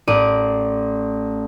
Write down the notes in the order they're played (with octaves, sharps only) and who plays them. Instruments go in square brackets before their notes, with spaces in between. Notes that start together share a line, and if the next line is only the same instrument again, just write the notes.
[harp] A1 D5 D#7